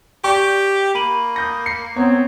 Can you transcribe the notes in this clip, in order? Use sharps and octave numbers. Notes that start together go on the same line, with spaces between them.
G4 D5 G5 C#6
A#3 B5 D#7 F#7
D#6 G6 A#6
C7
B3 C4 C#5 A#5 G#6